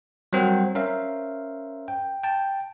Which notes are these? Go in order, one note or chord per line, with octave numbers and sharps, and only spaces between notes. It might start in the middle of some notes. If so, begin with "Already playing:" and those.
F#3 G3 C4 A#4 C5 F#5
C#4 A#4 C5 E5 F5
G5
G5 A5